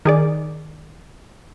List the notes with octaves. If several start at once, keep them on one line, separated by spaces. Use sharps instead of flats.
D#3 G#4 D5